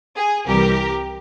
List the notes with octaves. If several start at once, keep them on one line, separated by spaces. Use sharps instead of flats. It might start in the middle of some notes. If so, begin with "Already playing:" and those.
G#4
C2 C3 E3 G3 G4 A#4